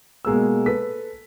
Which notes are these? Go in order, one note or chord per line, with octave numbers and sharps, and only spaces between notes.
B2 G#3 A#3 E6
A4 B4 B6